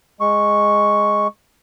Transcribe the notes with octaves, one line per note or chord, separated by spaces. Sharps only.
G#3 C#6